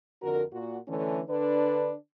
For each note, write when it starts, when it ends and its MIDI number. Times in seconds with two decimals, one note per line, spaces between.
0.22 0.43 41
0.22 0.43 50
0.22 0.43 66
0.22 0.43 70
0.52 0.78 46
0.52 0.78 66
0.88 1.21 50
0.88 1.21 52
0.88 1.21 57
0.88 1.21 61
0.88 1.21 62
1.29 1.93 50
1.29 1.93 62
1.29 1.93 71